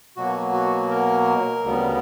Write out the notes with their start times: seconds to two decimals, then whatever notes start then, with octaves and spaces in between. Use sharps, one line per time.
0.16 B2 F#3 A#3 F#4
0.53 F#4
0.90 A#4
1.64 D2 C#3 G3 B3